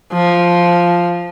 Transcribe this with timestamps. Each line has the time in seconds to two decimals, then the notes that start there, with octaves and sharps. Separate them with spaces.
0.13 F3